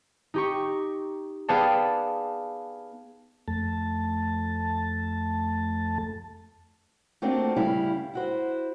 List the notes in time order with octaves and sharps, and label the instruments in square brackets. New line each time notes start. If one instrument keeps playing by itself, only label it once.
[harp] D#4 G4 C#6
B3 G#4 D5 F5 G5 A5
[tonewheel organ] F2 A3 A5
[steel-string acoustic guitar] A3 A#3 C4 D4 F4 F#4
D2 G2 C#3 G3 E4 F5
E4 F#4 C5